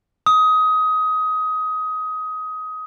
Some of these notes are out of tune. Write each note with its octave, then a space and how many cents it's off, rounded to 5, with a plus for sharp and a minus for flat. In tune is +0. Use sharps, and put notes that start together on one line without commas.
D#6 +20